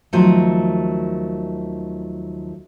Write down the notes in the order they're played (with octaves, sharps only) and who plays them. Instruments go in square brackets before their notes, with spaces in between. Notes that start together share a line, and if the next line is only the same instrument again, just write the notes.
[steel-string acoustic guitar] D#2 F3 F#3 A3